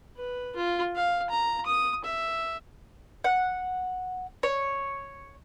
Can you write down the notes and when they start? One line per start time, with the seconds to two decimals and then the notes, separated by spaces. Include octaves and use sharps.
0.16 B4
0.56 F4
0.95 F5
1.30 A#5
1.66 D#6
2.04 E5
3.24 F#5
4.43 C#5